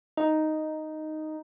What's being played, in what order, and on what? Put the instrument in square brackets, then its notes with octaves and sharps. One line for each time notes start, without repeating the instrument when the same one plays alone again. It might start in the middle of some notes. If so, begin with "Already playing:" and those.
[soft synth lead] D#4